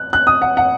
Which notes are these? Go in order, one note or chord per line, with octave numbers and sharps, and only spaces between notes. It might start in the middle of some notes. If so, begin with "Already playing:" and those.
Already playing: F#6
F#6
D#6
F#5
F#5